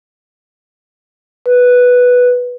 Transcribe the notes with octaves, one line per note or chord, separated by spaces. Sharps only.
B4